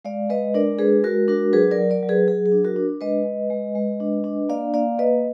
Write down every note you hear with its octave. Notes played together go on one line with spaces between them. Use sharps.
G#3 D5 F5
G#3 B4 D#5
D4 A#4 D5
G#3 G#4 B4
G#3 F#4 A#4
D4 F#4 A#4
F#3 G#4 B4
A#4 D5
F#3
A#4 D5
F#3
G#4 B4
F#3 G#4
G#4
D4
F#4 A#4
D4
G#3 B4 D#5
G#3
G#3
G#3
D4
D4
A#3 D5 F5
A#3 D5 F5
A#3 B4 D#5